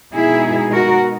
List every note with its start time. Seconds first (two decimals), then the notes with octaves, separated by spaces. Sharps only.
0.14 B2 G#3 D#4 E4 G#4
0.72 F#4 A#4